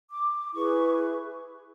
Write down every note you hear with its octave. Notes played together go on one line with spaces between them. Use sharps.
D6
E4 G#4 B4 C#6